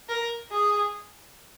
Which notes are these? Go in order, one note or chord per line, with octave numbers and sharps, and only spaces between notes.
A#4
G#4